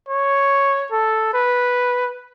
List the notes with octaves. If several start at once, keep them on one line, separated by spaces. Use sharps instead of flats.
C#5
A4
B4